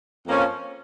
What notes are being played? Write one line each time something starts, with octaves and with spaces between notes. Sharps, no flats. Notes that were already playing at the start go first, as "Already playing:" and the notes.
F2 F3 A#3 C#4